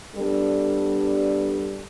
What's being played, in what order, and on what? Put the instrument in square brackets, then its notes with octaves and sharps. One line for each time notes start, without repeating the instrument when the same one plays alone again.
[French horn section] G3 B3 D4 A4